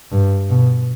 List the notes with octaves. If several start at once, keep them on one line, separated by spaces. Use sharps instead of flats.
G2
B2